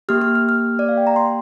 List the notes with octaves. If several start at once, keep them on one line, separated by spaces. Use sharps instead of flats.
A#3 G4 F6
F6
F6
F6
D5
F5
G5
A#5
C6